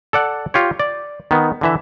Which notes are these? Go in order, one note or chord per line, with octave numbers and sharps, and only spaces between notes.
A4 D5 F#5
F4 G4 C#5
D5
D#3 B3
D3 E3 E5